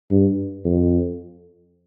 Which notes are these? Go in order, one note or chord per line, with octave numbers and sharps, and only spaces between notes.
G2
F2